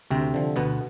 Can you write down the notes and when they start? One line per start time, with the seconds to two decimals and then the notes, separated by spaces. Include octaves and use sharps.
0.11 D2 C3 C4
0.34 D3 F3
0.56 D2 B2 B3